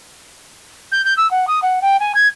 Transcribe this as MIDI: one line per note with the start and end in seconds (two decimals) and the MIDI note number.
0.92 1.04 91
1.05 1.14 91
1.17 1.29 88
1.31 1.46 78
1.48 1.60 87
1.62 1.80 78
1.82 1.97 79
2.00 2.13 80
2.15 2.28 92